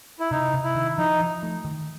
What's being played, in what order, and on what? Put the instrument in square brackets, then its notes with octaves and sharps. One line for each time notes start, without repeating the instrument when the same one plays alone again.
[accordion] E4
[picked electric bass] C3 [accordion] D#4
[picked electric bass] C3
[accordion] E4
[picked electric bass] D#3
[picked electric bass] F3 [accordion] D#4
[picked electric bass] F3
A3
D#3